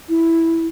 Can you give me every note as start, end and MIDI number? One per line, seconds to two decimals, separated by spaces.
0.09 0.67 64